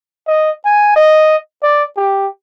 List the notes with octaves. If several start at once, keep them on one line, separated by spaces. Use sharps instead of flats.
D#5
G#5
D#5
D5
G4